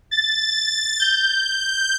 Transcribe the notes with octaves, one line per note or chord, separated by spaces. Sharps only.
A6
G6